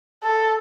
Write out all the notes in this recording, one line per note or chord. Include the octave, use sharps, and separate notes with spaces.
A4